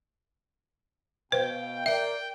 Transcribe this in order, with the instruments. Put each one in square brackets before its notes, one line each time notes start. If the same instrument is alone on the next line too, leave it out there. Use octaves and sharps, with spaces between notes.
[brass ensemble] B2 F5 [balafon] B4 C5 [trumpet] G5
[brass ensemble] A#4 D5 [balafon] E5 [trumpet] G5